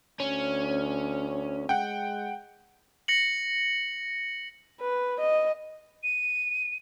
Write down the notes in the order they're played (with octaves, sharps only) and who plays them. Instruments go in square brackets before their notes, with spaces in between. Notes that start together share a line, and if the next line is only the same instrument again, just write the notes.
[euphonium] D2 [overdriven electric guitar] C#4
[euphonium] G#3 [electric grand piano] F#5 G5
[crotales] A#6 C#7 F#7
[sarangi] B4
D#5
[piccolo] D#7